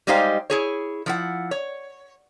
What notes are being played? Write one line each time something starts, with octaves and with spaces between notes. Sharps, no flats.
G3 G#3 D#4 G4 C5 F5
E4 G#4 C#5
F3 E4 F#5
C#5